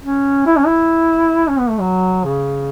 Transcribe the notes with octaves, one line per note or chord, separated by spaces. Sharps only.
C#4
E4
C#4
E4
C#4
B3
A3
F#3
C#3